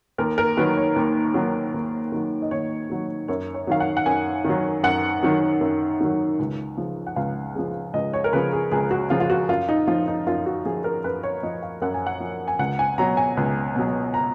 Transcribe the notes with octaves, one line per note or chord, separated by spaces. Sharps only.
D#2 A#4
A#4
D#3 F#3 B4
C#5
D#2
D#3 F#3
D#2
D#3 F#3
D#5
D#2 C#5
D#3 F#3
F#2 C#5
C#5
D#3 F#3 F5
F#5
F#5
F#2 G#5
D#3 F#3
F#2 F#5
D#3 F#3
F#2
D#3 F#3
C#2
C#3 F3
F#5
C#2 F5
C#3 F3
C#2 D#5
C#5
A#4
C#3 F3 B4
G#4
C#2 G#4
F#4
C#3 F3 F4
F4
F#4
F#2 F4
D#4
F3 F4
D#4
F#2 F4
F#4
F3 G#4
A#4
F#2 B4
C#5
F3 D#5
F5
F#2 F#5
G#5
F#5
F3
G#5
C#2 F#5
G#5
B2 F#3 A#5
G#5
C#2
B2 F#3
A#5